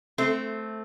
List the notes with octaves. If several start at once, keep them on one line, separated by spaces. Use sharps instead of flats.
A3 C4